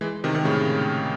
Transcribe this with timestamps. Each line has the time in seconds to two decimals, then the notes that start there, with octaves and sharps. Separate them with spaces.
0.01 E3 G#3
0.24 C3 D#3
0.35 C3 D#3
0.45 A2 C#3